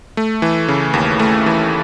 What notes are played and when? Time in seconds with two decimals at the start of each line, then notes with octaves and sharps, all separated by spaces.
0.17 A3
0.42 E3
0.68 C#3
0.94 D#2
1.19 A3
1.46 E3